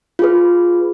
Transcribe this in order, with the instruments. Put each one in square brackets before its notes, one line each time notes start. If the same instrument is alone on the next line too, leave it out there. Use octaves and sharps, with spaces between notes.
[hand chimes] F4 G#4 B4